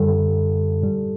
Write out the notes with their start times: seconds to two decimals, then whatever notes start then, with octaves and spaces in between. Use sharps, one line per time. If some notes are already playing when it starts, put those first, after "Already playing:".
Already playing: F#2 D3 G3 A4
0.82 A2 G3